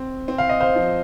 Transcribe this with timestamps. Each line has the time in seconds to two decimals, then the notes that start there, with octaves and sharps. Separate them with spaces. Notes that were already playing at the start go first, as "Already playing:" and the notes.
Already playing: C4
0.28 C4
0.38 F5
0.49 D#5
0.60 C5 F5
0.76 F3